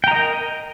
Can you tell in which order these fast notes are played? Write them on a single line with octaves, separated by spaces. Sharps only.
G5 A#5 D#5 A#4